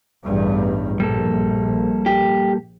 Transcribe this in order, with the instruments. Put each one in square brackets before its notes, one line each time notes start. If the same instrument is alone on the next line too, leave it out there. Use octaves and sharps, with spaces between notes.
[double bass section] A1 E2 G2
[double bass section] A#1 [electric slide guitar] G3 A#3 A4
[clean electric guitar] G4